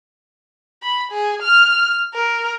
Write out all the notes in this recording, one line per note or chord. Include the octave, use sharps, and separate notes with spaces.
B5
G#4
F6
A#4